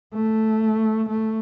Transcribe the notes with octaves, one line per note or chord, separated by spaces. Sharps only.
A3
A3